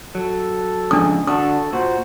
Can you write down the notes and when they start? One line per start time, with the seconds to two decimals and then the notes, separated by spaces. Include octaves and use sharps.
0.15 F#3 A4
0.91 F2 G#2 C#3 D4 D#6
1.27 D3 D4 F#4 A4 D#6
1.73 A#2 F#4 C5